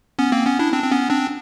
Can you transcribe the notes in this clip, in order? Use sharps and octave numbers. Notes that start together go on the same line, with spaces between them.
B3 C#4
A#3 C4
B3 C#4
D4 E4
C4 D4
C4
B3 C#4
C4 D4